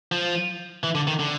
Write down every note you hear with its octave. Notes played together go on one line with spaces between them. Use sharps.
F3
E3
D3
D#3
D3